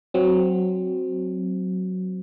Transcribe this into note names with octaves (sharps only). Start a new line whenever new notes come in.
F#3 C4